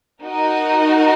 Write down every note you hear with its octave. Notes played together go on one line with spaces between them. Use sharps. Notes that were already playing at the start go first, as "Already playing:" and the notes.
D#4 F#4 A#4 D#5